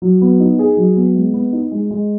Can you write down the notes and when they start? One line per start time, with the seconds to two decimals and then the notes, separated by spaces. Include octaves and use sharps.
0.02 F#3
0.22 B3
0.40 D#4
0.59 G#4
0.77 F#3
0.96 B3
1.15 G#3
1.34 B3
1.53 D#4
1.72 G#3
1.91 G#3